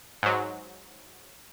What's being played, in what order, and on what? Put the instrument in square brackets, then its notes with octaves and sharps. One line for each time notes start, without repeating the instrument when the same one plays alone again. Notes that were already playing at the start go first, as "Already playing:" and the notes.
[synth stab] G#2 F#3